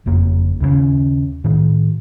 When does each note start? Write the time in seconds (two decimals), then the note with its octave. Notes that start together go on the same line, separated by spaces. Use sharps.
0.06 F#1 F2 A#3
0.61 D#2 C#3 G3 C#4
1.44 A2 D#3